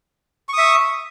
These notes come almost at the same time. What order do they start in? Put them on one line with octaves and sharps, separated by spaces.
C#6 D#6 E5